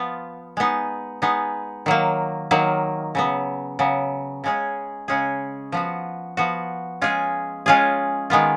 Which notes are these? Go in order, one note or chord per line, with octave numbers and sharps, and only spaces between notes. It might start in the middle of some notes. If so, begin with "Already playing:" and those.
Already playing: F3 B3 F4
G#3 B3 D#4
G#3 B3 D#4
D#3 F#3 A#3
D#3 F#3 A#3
C#3 F#3 B3
C#3 F#3 B3
C#3 G#3 C#4 G#4
C#3 G#3 C#4 G#4
F3 B3 F#4
F3 B3 F#4
G#3 C#4 F4 G#4
G#3 C#4 F4 G#4
D#3 G#3 B3 F4